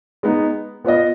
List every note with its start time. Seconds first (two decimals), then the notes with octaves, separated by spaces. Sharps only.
0.23 G#3 B3 D#4
0.84 B3 F4 B4 D#5